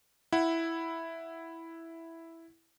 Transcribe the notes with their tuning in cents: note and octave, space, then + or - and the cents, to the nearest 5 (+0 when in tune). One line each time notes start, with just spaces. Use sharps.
E4 +0 F#5 +0